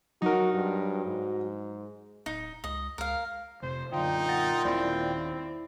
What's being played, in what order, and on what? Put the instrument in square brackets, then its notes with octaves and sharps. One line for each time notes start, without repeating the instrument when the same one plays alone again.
[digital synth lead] F#3 [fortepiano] D#4 A#4 [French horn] F#4
[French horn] G2
G#2
[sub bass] D1 [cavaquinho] D#4
[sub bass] C#2 [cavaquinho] D#5
[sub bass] C#2 [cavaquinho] A#4 F5
[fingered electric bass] F1 C3 [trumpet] C5
[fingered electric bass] F#2 D3 [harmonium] A#2 F4 G5 [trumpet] D#4
[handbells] F#5 A6 A#6
[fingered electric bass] D#1 D#3 [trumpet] C4 [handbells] E4 D5